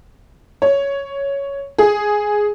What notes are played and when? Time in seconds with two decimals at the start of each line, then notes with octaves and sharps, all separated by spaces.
0.62 C#5
1.78 G#4